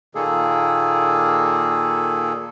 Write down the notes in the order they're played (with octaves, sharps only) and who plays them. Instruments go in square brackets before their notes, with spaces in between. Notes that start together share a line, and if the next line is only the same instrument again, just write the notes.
[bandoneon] A#2 D#3 A#3 G#4 A4